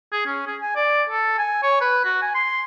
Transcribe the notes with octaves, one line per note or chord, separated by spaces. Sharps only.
G#4
C#4
G#4
G#5
D5
A4
G#5
C#5
B4
F#4
G#5
C6